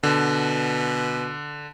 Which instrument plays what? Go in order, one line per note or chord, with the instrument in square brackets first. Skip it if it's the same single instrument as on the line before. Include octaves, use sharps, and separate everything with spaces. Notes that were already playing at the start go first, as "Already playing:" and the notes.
[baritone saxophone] B2 [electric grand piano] D3